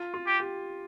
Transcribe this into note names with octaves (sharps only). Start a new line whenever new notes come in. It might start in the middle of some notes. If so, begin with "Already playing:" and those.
Already playing: F4
F4
G4
G4